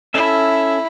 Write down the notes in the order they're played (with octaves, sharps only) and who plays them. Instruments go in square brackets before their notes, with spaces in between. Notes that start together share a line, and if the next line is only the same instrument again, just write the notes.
[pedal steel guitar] C#4 A4 E5 [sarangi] E4